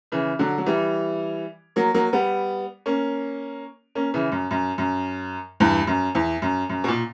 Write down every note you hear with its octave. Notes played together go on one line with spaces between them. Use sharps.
C#3 E3
D3 F#3
F#3
E3 G3
F#3 A#3
F#3 A#3
G3 B3
A#3 C#4
A#3 C#4
C#3 E3
F#2
F#2
F#2
E2 G2
F#2
E2
F#2
F#2
B2
A#2